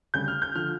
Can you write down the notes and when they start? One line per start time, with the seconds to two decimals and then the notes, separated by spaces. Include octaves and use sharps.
0.14 D2 C#3 G3 G6
0.28 F6
0.42 G6
0.55 D3 F3 F6